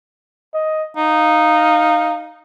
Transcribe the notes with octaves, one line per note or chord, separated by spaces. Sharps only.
D#5
D#4 F5